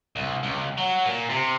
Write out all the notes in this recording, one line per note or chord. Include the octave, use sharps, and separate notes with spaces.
C2
C#2
F#3
A#2
C3